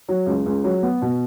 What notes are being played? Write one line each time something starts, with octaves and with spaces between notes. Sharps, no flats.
F#3
C#2
C#2
F#3
B3
B2